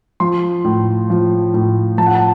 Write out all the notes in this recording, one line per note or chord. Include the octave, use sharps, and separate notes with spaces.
F3 C6
A2
F3
A2
F3 A5
F#5
A5